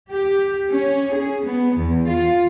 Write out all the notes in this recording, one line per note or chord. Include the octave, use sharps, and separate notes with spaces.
G4
C#4
G#4
B3
E2
F4